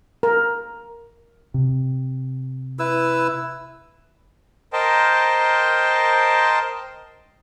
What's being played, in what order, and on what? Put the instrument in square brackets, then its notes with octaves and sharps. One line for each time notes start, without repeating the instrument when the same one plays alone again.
[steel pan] A#4
[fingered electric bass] C3
[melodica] E4 B4 E6
[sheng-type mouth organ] A#4 C5 D#5 G5 A5